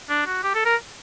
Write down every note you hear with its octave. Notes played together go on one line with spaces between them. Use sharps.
D4
F#4
G4
A4
A#4